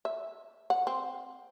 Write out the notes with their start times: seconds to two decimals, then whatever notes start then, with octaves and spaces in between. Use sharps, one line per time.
0.05 E5
0.70 F#5
0.87 C4